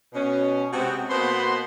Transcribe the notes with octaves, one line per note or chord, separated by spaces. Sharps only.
B2 C#4
C3 G#3 B3 C4 F#4
B2 A#3 B3 C5 B5 C6